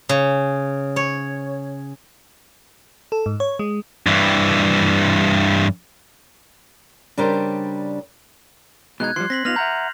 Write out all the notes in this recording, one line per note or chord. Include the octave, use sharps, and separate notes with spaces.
C#3
C#5
A4
G#2
C#5
G#3
G2 E3
C#3 G3 D4 G4 A#4 C5
B2 G#3 D#4 F#6 G#6
E3 F3 G3 C6 C7
C4 A#6 B6 F#7
B3 D#4 F4 F6 A#6 F7
E5 F#5 A#5 G6